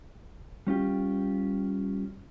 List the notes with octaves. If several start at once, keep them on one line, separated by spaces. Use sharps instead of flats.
G3 C#4 F4 G4